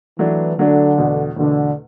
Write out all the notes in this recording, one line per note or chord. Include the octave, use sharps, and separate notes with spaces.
E3 F#3 A3 D4
D3 F#3 A3 D4
E2 B2 A3
E2 B2 D3 A3